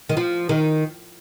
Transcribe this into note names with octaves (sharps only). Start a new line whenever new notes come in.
D#3
F3
D#3